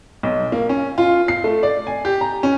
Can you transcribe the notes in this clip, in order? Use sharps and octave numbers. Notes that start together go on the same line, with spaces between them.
B1
A#3
C#4
F4
C7
A3
D5
G#5
G4
A#5
C#4